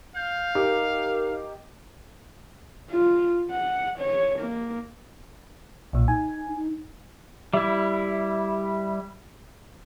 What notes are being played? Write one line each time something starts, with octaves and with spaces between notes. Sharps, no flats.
F5 G6
D#4 G4 A#4 D#5
F4
F#5
C#5
A#3
B1 A#2
D#4 G#5
D#4
G3 E4 E5